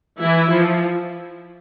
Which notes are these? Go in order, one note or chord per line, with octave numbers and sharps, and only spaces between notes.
E3 E4
F3